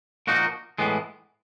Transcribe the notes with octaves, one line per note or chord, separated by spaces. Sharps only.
A#2 F3 A#3 D#4 F#4
A2 E3 G#3 B3